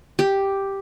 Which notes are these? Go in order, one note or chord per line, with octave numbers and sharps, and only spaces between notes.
G4